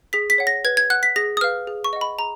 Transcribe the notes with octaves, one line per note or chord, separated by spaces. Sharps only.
G#4 B6
B6
C#5 F#5
A#6
B4 G#6
G#6
F#5 F#6
B6
G#4 A#6
D#6
B4 F5 F6
G#4
C#6
D#5 F#5
B5
G#4 A#5